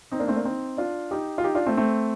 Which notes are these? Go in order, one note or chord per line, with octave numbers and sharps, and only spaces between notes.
C4 D#4
A#3 D4
A3 C4
A#3 D4
C4 D#4
D4 F4
D#4 G4
F4
D#4 G4
D4 F4
A3 C4
A3 C4